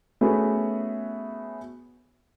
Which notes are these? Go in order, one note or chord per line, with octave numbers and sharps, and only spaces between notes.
A3 B3 C#4 F#4 G#4